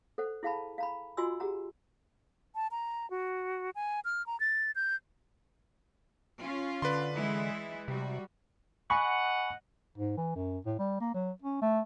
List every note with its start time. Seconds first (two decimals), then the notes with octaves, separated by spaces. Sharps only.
0.18 A4 C5 F#5
0.43 E4 G#4 F5 F#5 A5 B5
0.78 F5 A#5 B5
1.17 F4 F#4 D#5 G#5 C6 E6
1.40 G4 G#4 F#5 A#5
2.54 A5
2.71 A#5
3.11 F#4
3.75 G#5
4.05 F6
4.26 A#5
4.40 A6
4.75 G6
6.41 C#4 F4
6.82 D3 B4 D5 C6
7.15 E3 G#3 E4
7.88 C3 G3 F#4
8.90 D#5 F#5 G#5 B5 C#6
9.98 G#2
10.17 E3
10.36 F#2
10.66 A2
10.79 G3
11.01 A#3
11.14 F#3
11.42 C#4
11.62 A3